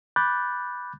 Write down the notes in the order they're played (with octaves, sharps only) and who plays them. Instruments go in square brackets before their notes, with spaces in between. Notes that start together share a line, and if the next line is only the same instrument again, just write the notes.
[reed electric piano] B5 D6 F#6 G6 A6